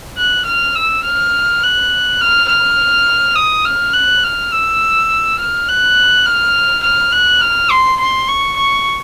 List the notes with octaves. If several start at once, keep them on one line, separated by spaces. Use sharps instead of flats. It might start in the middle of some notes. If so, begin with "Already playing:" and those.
F#6
F6
E6
F6
F#6
F6
F6
D#6
F6
F#6
F6
E6
F6
F#6
F6
F6
F#6
F6
C6
C6
C#6
C#6